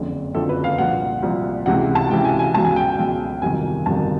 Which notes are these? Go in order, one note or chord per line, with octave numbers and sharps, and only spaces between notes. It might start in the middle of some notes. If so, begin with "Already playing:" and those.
Already playing: F#1 F2 D3 F3
F#1 F2 D3 F3 A4
B4
F5
C2 A#2 F3 F#5
C2 A#2 F3
C#2 C3 E3 F#5
A5
C#2 C3 E3 G5
G#5
G#5
C#2 B2 F#3 A5
G#5
G5
G5
C#2 B2 F#3
G1 F2 C3 D#3 F#3 G#5
G1 F2 C3 D#3 F#3 A5